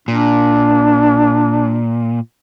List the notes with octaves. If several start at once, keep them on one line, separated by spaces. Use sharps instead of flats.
A#2 D4